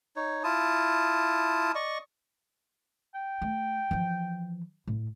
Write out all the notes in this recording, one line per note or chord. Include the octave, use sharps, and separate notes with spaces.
D#4 C#5
E4 F4 A5 D#6
D5 D#5 C#6
G5
A3
E3 F3
A2